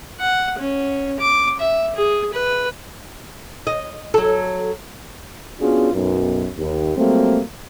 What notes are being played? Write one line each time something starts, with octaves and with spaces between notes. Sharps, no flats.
F#5
C#4
D6
E5
G#4
B4
D#5
F#3 A4
B3 C#4 D4 F4 F#4 G#4
B1 F#2
D#2
F#3 G3 A3 A#3 C4